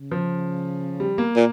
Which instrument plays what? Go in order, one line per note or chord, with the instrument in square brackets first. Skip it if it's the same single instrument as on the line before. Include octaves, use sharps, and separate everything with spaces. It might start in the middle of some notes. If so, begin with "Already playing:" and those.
Already playing: [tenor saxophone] C#3
[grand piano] F3
G3
A#3
[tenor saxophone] A#2